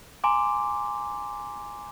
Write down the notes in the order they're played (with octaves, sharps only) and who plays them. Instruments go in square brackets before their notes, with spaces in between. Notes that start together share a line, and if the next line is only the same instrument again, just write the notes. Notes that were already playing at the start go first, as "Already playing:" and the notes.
[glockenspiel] G#5 A#5 C6 D6